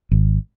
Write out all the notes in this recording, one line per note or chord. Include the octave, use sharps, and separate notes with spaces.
G#1